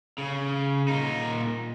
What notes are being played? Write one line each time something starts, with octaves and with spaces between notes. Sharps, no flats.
C#3
A#2 D#4